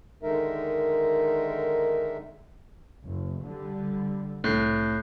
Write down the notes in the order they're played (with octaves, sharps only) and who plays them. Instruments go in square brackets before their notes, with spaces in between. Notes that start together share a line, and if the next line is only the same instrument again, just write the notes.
[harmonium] D3 D#3 G#3 D#4 A#4 E5
[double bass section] F#1
D3 G3
[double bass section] C2 [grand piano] A2 [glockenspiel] F#6 G6 C7